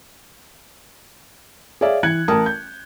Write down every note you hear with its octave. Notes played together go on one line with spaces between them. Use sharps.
G#4 C#5 D5 E5 F5
E3 F#6 G#6 C#7
A1 A#4 A5 D#6
G6